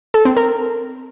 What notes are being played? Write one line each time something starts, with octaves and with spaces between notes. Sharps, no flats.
A4
C4
A#4